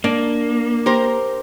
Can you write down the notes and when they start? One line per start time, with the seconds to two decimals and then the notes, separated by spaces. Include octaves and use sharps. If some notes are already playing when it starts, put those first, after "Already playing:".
0.04 A#3 D4
0.86 G4 A#4 C5